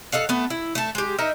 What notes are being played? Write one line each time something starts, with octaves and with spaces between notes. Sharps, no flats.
A4 D#5 F5 F#5
A3 B3
E4
A3 A5
G#3 G4
D#4 A#4 D#5 E5